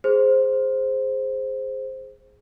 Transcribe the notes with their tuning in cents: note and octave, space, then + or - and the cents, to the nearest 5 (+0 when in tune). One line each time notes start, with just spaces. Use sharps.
G#4 +0 C5 +0